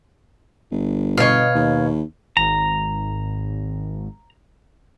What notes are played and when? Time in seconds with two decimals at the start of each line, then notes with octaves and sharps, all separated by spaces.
0.71 G1
1.18 B2 C#5 D#5 F5
1.55 D#2
2.37 G#1 A#5